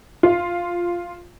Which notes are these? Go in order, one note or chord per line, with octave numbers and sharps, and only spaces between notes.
F4